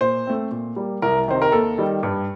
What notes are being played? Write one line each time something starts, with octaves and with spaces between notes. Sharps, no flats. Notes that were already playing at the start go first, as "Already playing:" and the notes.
A#2 C5
A3 C4
A#2
G3 A#3
C2 A#4
C3 D#3 C5
A#4
D#2 A4
D#3 G3
G2